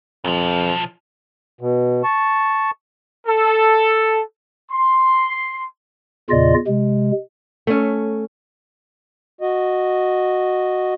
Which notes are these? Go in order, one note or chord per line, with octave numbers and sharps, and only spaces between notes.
B1 F2 F3
B2
A5 C#6
A4
C6
E2 A#2 C#3 F4 D5 D#5
C3 G#3
A3 C#4
F#4 D#5